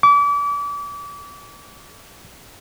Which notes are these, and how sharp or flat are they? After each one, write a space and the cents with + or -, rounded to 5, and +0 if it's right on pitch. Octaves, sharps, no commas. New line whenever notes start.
D6 -35